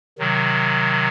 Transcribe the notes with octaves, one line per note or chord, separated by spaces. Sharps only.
C3 D#3 F#3